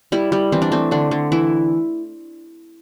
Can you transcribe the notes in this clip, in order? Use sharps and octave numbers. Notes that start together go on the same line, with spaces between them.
G3 E4
G3
E3 C4
D4
A3 C4
D3 D4
D3
E3 E4